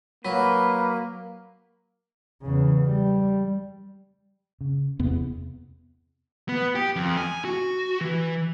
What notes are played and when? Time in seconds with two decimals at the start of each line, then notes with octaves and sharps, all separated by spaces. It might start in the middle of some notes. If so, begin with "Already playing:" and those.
0.25 F#3 A#3 B4
2.42 E2 C#3
2.85 G3
4.61 C#3
4.99 E2 C3 B3
6.49 B3
6.75 G4
6.96 F2
7.17 G#5
7.45 F#4
8.01 E3